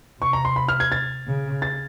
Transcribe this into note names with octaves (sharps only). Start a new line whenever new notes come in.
C3 C#6
A#5
C6
B5
F6
G#6
A6
C#3
A6